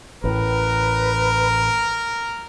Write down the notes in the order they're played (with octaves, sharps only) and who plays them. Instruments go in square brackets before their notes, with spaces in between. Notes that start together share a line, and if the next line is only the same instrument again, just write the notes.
[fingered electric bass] A1 A2 [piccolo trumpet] A#4 [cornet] B4